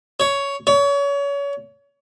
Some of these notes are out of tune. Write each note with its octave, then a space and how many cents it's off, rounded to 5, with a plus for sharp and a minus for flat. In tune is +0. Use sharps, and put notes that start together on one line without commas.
C#5 +10
C#5 +30